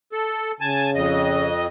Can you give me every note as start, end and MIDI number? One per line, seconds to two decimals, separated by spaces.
0.12 0.52 69
0.61 1.50 49
0.61 0.90 80
0.61 0.90 81
0.95 1.67 41
0.95 1.67 75